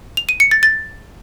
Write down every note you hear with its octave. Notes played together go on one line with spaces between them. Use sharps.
F7
D#7
C#7
A6
A6